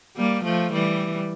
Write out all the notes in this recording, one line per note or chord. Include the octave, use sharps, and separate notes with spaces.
G3 A#3
F3 A3
E3 G3